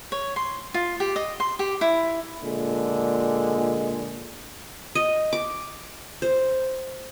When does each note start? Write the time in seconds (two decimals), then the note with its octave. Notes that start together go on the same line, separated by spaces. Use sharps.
0.12 C#5
0.36 C6
0.74 F4
1.00 G4
1.16 D#5
1.40 C6
1.59 G4
1.81 E4
2.43 A#2 D3 G#3
4.95 D#5
5.33 D6
6.22 C5